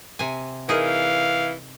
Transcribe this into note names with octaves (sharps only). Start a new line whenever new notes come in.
C3 G#5
E3 D#4 G#4 A#4 F5